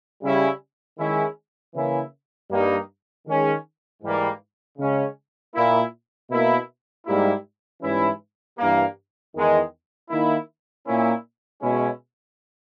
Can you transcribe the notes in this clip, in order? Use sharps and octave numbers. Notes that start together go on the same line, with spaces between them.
C#3 G3 C#4 E4
D#3 G#3 C#4 E4
C#3 E3 A#3 C#4 E4
G2 G3 A#3 D#4
D#3 G#3 C#4
G#2 E3 G3 A#3
C#3 G#3 C#4
A#2 A#3 E4
B2 A#3 E4
G#2 G3 A#3 E4
G#2 E3 G3 C#4 E4
G2 E3 G3 A#3
E2 D#3 G#3
D#3 A#3 E4
A#2 A#3 C#4 E4
B2 G#3 C#4 E4